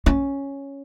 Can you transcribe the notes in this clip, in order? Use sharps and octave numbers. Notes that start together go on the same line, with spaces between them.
C#4